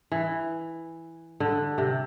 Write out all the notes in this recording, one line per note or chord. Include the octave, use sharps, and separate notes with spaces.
E3
D3
C3